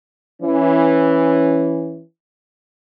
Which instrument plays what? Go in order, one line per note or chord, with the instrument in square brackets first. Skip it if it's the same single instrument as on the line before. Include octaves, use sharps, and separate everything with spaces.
[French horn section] E3 C#4